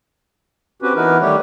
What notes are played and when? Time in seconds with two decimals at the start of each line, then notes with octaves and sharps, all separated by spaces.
0.82 C4 C#4 F#4 G4 B4
0.96 E3 B3 D#4 E4 A#4 B4
1.21 D#3 G3 A3 G4 C#5